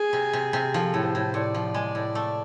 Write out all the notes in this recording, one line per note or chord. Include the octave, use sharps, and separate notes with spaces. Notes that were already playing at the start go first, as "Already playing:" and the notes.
Already playing: G#4
C3
C3
C3
F3 A4
A2
C5
A2
A2 D5
F3
G#3
A2
A3